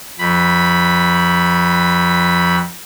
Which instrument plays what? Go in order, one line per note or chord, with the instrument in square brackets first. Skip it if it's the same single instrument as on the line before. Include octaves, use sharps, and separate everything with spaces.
[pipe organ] F2 B5